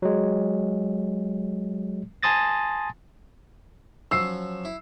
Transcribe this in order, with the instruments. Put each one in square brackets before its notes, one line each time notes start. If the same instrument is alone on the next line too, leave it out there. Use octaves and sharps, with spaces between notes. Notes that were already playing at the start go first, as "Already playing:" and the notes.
[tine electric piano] F#3 G#3
G#5 A5 C6 D#6 A6 A#6
[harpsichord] F3 F#3 C#4 [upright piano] E6 C7
[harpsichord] E4